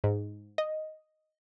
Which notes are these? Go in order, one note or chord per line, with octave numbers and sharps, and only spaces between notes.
G#2
D#5